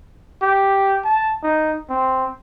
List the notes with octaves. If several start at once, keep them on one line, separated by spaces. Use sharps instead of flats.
G4
A5
D#4
C4